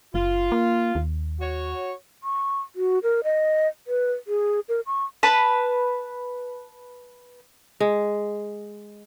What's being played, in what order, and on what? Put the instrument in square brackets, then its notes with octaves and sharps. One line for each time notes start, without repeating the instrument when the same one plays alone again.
[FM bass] F#1 [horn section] F4
[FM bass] A#3
D#2
[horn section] F#4 C#5
[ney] C#6
F#4
A#4
D#5
B4
G#4
A#4
C#6
[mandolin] B4 A5 B5
[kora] G#3